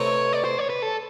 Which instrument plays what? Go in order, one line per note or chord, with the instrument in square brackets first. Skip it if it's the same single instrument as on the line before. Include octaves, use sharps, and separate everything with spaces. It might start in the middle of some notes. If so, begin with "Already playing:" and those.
Already playing: [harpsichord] C3 E3 A3 C4 D#4 [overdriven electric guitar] C#5
[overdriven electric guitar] D5
C5
C#5
B4
A4